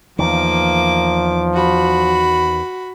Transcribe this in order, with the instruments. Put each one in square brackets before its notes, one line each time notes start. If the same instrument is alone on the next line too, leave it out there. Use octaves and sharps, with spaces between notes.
[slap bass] E2 D#3 [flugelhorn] F3 [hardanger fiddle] A#3 D6
[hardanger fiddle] F#4 B5